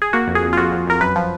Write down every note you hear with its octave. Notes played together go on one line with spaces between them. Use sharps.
G#4
A#3 F#4
F2
G#4
F2
F4
F2 F#4
F2
F2 A#4
F#2 B4
F3